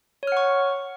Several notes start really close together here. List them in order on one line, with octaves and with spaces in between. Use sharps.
C#5 F6 F#5 C#6